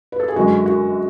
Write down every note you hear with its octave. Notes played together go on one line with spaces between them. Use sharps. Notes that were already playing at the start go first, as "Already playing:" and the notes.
B4
A4
G#4
F#2 D3 G#3 F#4
F#4